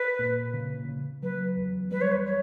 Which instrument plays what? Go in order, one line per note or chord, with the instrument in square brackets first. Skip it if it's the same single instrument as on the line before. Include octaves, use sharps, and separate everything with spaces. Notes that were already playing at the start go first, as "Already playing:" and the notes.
Already playing: [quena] B4
[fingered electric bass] A#2
C#3
C#3
[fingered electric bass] F#3 [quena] B4
[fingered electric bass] E2
[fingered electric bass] G3 [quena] B4
[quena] C#5
B4
C#5